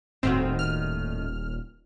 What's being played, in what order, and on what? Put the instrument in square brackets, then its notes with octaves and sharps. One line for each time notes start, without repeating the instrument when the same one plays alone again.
[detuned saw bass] D#1 [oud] A2 D#3 F#4 [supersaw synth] C4
[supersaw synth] F6